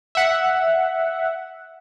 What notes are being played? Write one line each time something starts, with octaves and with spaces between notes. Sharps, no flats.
E5 F#5